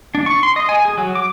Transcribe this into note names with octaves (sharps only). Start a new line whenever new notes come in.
D4
C#6
C6
D#5
G#5
G#4
F#3
D6